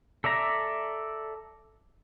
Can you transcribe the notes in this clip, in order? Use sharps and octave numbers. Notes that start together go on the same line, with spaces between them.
A4 D5 E5 A#5